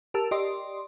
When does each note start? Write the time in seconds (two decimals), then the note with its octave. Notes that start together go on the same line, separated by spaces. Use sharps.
0.14 G4 A#4 A5 E6
0.31 G4 D5 D#5 C6